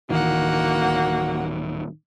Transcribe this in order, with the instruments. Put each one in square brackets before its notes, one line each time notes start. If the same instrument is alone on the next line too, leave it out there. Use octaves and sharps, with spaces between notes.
[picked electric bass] D1 D#3 E3 [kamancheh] A#3 F#5 [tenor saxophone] F#4